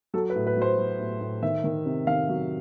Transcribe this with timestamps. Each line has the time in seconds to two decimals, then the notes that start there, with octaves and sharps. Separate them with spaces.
0.14 F#3 A4
0.30 B4
0.35 A2
0.47 B4
0.56 F#3
0.62 C5
0.78 F#3
1.00 A2
1.21 A2
1.42 D#3 E5
1.64 D#3
1.86 C3
2.07 D#3 F5
2.29 F#3